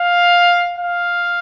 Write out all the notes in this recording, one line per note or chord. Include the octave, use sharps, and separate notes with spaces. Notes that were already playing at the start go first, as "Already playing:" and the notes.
Already playing: F5
F5